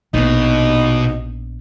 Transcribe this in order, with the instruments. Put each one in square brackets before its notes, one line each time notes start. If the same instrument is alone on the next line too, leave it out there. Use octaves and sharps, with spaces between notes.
[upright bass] A#1 B3 [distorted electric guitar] B2 [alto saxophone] D#4